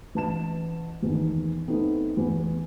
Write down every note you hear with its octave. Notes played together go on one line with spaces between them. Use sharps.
A1 A5 E7
E2 D#3
A3 B3 C4 D#4
E2